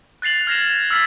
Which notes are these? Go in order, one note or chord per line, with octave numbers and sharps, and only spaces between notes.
F#6 A6 C7 F7 F#7
F6 G#6 A#6 C7 E7
G#6
E6 F6 G#6 A6 B6